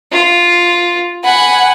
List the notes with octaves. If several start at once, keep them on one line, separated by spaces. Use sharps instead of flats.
F4
F#5 G#5 B5